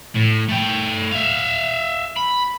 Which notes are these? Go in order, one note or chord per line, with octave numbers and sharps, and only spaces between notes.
A2
A3 G5
E5 F5
B5